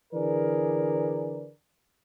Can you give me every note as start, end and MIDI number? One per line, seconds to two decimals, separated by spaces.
0.13 1.50 50
0.13 1.50 52
0.13 1.50 68
0.13 1.50 70
0.13 1.50 71
0.13 1.50 74